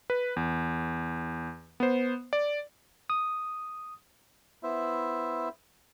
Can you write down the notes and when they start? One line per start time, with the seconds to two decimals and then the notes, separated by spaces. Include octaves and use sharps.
0.10 B4
0.36 E2
1.80 B3 C5
2.33 D5
3.10 D#6
4.63 B3 E4 C5 E5